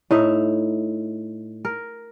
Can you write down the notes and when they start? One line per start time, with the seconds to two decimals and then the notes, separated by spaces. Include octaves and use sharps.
0.11 A2 D#4 E5
1.65 A#4